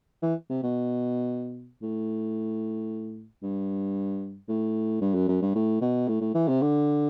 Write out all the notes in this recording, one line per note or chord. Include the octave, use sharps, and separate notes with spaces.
E3
C3
B2
A2
G2
A2
G2
F#2
F#2
G2
A2
B2
A2
A2
E3
C3
D3